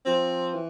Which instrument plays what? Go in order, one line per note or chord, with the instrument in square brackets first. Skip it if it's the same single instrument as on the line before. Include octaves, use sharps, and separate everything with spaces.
[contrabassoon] F3 [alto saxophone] C4
[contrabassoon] E3